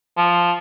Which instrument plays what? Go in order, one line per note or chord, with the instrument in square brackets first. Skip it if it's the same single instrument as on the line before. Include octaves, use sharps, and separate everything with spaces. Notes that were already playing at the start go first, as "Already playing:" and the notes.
[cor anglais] F3